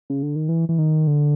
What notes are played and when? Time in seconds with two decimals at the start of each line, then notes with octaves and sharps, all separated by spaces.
0.10 C#3
0.23 D3
0.36 D#3
0.49 E3
0.69 E3
0.78 D#3
1.07 D3